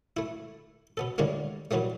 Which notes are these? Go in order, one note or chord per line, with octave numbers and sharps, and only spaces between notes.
A3 E4
B2 B3 A4
A2 D3 G3 G#3 A#3
A#2 E3 F#3 G3 A3